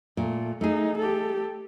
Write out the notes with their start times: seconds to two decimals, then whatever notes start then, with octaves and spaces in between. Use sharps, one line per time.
0.17 A#2 A3
0.61 A3 D#4 G#4
0.97 G4 A4